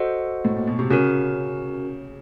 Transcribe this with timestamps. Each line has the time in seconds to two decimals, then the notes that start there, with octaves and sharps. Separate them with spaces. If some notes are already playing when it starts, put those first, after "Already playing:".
Already playing: F#4 A4 C5 D#5 F#5
0.45 A2
0.56 A#2
0.67 B2
0.79 C3
0.90 C#3 C#4 F#4 A#4